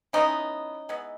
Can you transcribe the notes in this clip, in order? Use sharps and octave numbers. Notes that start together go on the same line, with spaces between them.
E3 G#3 B3 C#4 D#4
E3 G#3 B3